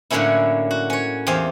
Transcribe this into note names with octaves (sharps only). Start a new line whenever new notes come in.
A2 D3 F#3 A#3 C#4 E4
F#4
C#4 C#5
E2 C4 G4 F5 G#5